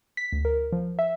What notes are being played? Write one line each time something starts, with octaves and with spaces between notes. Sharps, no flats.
B6
D2
A#4
F3
E5